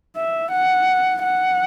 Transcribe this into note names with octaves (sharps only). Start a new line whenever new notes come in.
E5
F#5
F#5